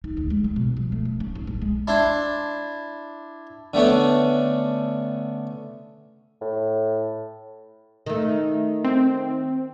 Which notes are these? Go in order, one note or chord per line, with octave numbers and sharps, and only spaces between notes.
D#4
D2
G#3
G3
B2
F3
A3
G3
C#4
B1
A#1
G#3
D4 E4 C6
D3 A3 B3 C#4
A2
D#3 A3
C4